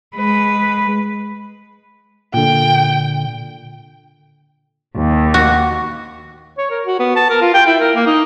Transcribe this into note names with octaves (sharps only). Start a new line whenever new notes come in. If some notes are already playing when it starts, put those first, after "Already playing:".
G#3 B4
A#2 D3 G5
D#2
F#4
C#5
A#4
F#4
B3
A5
A#4
F4
G5
E4
A#4
A#3
D#4